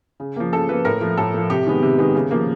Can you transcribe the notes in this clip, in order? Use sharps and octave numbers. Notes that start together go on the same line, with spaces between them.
C#3
F3 A#3
C#3 A4
F3 A#3 B4
A2 A#4
F3 A3
A2 A4
F3 A3
C3 G4
D#3 G#3 B3
C3
D#3 G#3 B3
C#3
F3 A#3